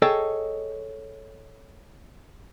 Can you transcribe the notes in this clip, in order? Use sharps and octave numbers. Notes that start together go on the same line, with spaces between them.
G#4 A4 C#5 D#5 G5 A5